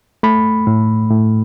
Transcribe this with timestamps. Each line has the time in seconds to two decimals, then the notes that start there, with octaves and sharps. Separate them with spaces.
0.23 A3 B5
0.67 A2
1.10 A2